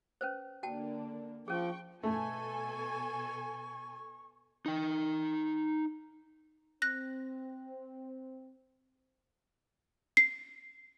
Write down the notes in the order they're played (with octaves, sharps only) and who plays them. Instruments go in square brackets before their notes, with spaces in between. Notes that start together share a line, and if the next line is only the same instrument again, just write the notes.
[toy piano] C#4 B4 C5
[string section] D3 A#3 D4 [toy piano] F#4 G5 A5
[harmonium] F3 [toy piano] C#4 G#4 [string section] G5 C#6
[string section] B2 A4 G#5 [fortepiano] A3 [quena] C#6
[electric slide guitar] D#4 G5
[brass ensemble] C4 [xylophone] F#6 A#6
[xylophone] C7